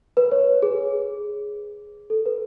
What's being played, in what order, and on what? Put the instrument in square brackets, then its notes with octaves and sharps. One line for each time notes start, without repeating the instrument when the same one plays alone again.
[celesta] B4
C#5
G#4
A4
B4